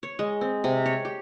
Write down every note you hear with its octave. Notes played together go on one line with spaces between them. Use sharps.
C#5
G#3
C4
C3
C#5
G4